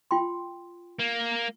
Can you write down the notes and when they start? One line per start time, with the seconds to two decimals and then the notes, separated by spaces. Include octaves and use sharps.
0.11 F4 G5 C6
1.00 A#3